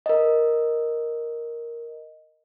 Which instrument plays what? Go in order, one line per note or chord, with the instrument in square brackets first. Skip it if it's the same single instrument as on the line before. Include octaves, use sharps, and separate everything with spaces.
[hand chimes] A#4 D#5